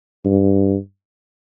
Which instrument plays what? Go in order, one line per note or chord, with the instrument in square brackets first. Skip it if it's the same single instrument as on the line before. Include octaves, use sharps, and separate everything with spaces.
[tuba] G2